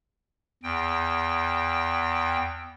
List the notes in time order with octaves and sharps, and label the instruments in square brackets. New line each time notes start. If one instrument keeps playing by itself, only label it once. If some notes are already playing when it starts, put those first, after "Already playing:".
[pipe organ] E2 G5